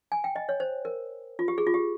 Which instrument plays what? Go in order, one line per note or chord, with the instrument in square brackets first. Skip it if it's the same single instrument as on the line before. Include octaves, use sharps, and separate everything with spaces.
[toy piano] G#5
G5
D#5
C#5
C5
A#4
F4
G4
G#4
F4
G4